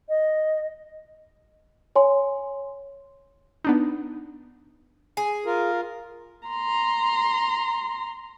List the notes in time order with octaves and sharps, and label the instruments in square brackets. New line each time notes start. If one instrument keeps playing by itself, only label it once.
[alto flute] D#5
[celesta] C#5 G#5 C6
[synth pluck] B3 D4 D#4
[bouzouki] G#4
[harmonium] F4 A#4
[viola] A#5 C6